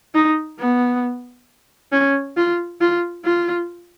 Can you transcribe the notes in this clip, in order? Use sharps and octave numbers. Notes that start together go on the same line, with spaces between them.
D#4
B3
C#4
F4
F4
F4